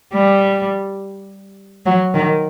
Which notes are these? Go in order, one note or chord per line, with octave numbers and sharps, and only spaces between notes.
G3
F#3
D#3